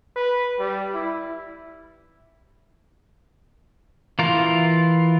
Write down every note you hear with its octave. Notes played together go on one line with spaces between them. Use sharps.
B4
G3
E4
E3 F4 A#4